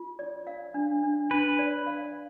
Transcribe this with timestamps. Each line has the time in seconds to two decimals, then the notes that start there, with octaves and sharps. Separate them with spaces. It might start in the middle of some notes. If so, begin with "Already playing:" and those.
Already playing: F4
0.19 D5
0.47 F5
0.74 D4
1.03 D4
1.30 D4 B4
1.59 D5
1.86 F5